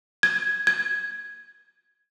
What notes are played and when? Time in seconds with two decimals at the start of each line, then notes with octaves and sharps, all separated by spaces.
0.23 G#6
0.67 G#6